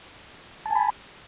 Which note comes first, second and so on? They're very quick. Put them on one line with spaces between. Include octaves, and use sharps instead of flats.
A5 G#5 B5